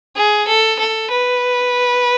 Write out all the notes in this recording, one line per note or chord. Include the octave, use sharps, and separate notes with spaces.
G#4
A4
A4
B4